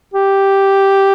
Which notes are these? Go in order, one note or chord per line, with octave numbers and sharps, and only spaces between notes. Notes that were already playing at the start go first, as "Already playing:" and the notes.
G4